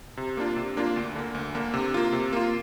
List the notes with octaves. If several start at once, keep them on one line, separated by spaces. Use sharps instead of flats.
C3
A#3 D4 F4
C3
A#3 D4 F4
D2
D3 A#3
D2
D3 A#3
C3
A#3 F4
C3
A#3 F4